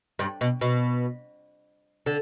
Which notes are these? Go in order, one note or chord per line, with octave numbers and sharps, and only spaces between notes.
G2
B2
B2
D3